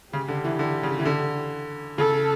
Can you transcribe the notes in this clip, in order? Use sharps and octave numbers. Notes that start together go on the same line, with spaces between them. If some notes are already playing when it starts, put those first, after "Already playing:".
C#3 G4
D3
E3
D3
C#3
E3
D3
C#3 A4